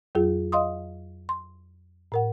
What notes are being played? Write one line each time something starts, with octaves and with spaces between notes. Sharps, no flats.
F2 F#3 F4 G#4
D#5 F5 C6 D#6
C6
A2 A#4 F#5